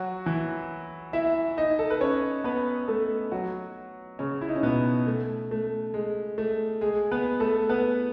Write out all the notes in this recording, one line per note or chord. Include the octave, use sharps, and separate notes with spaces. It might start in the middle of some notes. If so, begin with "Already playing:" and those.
Already playing: F#3 F#4
E3 E4
E4 E5
D#4 D#5
A4
B4
C#4 C#5
B3 B4
A3 A4
F#3 F#4
C#3 C#4
E4
D#4
C#4
B2 B3
A3
A3
G#3
A3
G#3 G#4
B3 B4
A3 A4
B3 B4